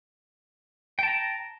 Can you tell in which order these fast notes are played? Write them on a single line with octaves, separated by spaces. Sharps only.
G5 A5 A#5